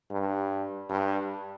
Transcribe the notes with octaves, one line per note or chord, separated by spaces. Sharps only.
G2
G2